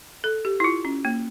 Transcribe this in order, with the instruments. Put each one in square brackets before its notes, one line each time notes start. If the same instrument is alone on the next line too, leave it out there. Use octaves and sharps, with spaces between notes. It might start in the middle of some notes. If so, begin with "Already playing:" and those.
[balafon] A4
G4
E4
F4
C#4
A#3